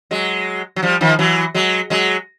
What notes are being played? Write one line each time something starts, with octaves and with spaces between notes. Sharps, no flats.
F#3 G#3
F#3
F3 G3
D#3 F3
E3 F#3
F#3 G#3
F#3 G#3